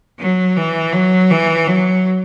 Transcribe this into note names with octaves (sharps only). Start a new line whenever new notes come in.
F#3
E3
F#3
E3
F#3